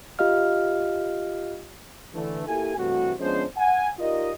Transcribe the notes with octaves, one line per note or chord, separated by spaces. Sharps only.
F4 G4 D#5 F5 F6
D3 E3 A3
A#3 E4 G4 A4 G#5
G2 C3 E3 A3 F#4
F3 G#3 B3 C#4 D4 C5
F#5 G#5
D#4 F4 G4 A#4 D5 D#5